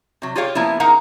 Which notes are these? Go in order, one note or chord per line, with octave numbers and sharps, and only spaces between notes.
C3 F#3
F4 G4 G#4 C#5 F5
F3 A#3 B3 E4
D#4 G#4 A#4 F5 F#5 A#5